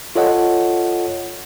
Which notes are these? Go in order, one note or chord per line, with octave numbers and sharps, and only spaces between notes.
F4 A4 C#5 D#5 F#5